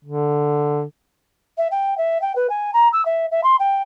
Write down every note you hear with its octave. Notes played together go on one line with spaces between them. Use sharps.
D3
E5
G5
E5
G5
B4
G#5
A#5
E6
E5
E5
C6
G5